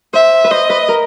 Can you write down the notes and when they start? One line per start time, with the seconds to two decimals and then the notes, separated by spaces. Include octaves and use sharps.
0.13 C5 E5
0.44 B4
0.51 C5 D#5
0.70 B4
0.89 A#4